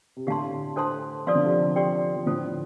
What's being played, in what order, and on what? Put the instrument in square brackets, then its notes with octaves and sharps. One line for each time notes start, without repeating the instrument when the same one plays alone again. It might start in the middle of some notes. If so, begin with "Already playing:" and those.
[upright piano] C3
[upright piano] A2 D3 [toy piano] G4 F5 A5 C6
[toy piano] D4 A4 C5 A5 C6
[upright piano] F3 [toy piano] A4 D5 F5 C6
[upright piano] D3
C3 F3
[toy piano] G4 D5 G5 C6
[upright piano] F3
[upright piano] A2 D3 [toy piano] F4 A4 C5